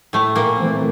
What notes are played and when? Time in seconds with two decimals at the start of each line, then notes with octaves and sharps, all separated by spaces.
0.13 A2 A3
0.36 A#2 A#3
0.58 E3 A3 C4